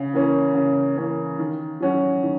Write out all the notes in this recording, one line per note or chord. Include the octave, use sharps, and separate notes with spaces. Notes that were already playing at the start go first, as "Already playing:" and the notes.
Already playing: C#3
E3 A#3 C#4
C#3
E3 A#3 C#4
D#3
F#3 C#4 F#4
D#3